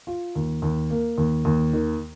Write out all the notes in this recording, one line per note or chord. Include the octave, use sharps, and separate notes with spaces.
F4
D#2
D#2
A#3
D#2
D#2
D#3